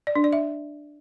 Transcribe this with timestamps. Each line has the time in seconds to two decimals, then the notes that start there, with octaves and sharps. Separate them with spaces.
0.07 D5
0.15 D4
0.24 D5
0.33 E5